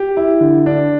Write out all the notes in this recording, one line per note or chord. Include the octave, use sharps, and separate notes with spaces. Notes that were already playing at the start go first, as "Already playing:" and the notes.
Already playing: G4
E4
D3
D4